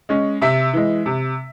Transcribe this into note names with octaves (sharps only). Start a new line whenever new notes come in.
G#3 C#4
C3 E5
E3 G#3
C3